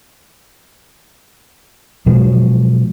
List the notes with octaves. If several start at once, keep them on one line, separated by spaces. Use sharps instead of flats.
B2 F3 F#3 G#3